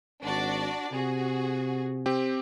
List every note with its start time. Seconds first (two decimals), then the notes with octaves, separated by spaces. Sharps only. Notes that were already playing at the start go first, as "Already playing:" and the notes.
0.23 G#1 D4 F#4 D5
0.92 C3 F#4 G#4
2.06 C4 G4